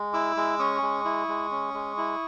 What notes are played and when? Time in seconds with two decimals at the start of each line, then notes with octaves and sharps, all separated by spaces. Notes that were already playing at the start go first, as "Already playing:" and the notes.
Already playing: G#3
0.13 E4 D6 E6
0.37 G#3
0.59 C#4 C#6 D#6
0.82 G#3
1.05 E4
1.28 G#3
1.51 C#4
1.74 G#3
1.97 E4